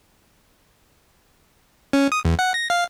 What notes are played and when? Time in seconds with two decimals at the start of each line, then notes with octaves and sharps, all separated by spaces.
1.93 C#4
2.12 D#6
2.25 E2
2.39 F#5
2.54 A#6
2.70 F5